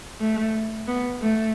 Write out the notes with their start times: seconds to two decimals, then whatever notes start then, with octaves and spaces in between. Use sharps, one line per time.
0.20 A3
0.87 B3
1.21 A3